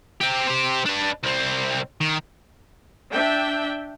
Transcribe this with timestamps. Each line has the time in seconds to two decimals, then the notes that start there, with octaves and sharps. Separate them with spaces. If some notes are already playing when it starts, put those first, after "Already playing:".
0.21 C4 G4
0.47 G4 C5
0.86 D4 B4
1.23 C2 C4
2.01 D#3
3.11 D4 E5 G5